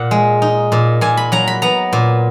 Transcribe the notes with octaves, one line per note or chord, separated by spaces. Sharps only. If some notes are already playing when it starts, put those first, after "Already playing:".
Already playing: A#2 F#5
G#3
D#4
A#2
A#2 G#5
B5
F#3 A#5
B5
B3 A#5
A#2